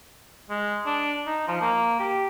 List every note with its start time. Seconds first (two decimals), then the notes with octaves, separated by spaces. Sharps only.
0.50 G#3
0.86 D4
1.27 D#4
1.48 F3
1.62 A#3
2.00 G4